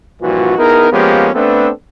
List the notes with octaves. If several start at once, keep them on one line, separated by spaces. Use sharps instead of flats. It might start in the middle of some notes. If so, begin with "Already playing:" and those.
G2 A#2 E3 F3 F#4
B3 D#4 E4 G#4 A#4
F3 G#3 A#3 B3 C#4 G4
A3 B3 C4 D4 A4 B4